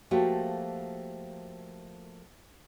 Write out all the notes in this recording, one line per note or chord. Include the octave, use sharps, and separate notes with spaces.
F3 A3 A#3 F#4 G4